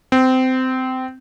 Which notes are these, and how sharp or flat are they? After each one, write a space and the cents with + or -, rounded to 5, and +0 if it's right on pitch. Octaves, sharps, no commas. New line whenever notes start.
C4 -20